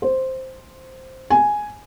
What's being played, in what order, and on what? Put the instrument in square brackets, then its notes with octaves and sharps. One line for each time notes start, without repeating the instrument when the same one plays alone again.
[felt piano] C5
G#5